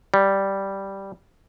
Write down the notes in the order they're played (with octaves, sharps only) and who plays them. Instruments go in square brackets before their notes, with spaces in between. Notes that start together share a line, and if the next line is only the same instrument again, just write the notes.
[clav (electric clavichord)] G3